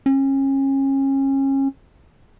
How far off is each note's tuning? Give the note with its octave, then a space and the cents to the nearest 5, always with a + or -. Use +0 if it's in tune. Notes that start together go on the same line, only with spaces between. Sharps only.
C#4 -30